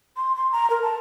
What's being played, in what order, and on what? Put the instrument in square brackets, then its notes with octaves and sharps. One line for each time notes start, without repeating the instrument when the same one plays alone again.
[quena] C6
C6
A#5
A#4
A5